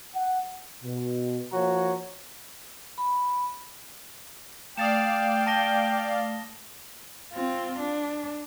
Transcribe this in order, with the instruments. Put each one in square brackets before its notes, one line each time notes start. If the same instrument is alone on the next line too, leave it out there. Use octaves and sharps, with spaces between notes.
[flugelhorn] F#5
[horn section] B2
F3 A#3 F#4 C#5 A#5
[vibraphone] B5
[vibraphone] A3 [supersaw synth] D5 F5 [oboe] G5 [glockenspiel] D#6 A6 E7
[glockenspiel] A5 A#6 G7
[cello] C4 F4
D4